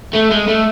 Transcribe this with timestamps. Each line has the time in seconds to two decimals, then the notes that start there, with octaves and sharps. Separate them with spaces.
0.15 A3
0.31 G#3
0.48 A3